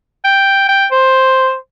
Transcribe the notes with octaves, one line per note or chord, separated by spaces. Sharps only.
G5
G5
C5